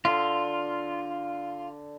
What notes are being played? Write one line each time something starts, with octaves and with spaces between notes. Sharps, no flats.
D3 F4